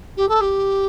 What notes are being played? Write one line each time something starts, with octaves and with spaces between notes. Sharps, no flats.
G4
A4
G4